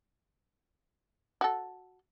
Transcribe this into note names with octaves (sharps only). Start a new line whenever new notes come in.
F#4 A4